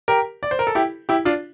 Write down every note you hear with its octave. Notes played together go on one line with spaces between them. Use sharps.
G4 A#4
D5
C5
A#4
A4
E4 G4
E4 G4
D4 F4